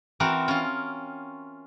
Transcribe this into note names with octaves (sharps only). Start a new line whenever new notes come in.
E3 C4 F#4 A#4
C#4 F4